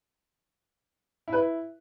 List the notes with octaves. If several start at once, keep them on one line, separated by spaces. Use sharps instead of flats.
E4
B4
E4